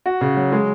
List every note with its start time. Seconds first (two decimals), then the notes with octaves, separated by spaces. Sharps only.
0.06 F#4
0.21 C#3
0.37 F#3
0.52 G#3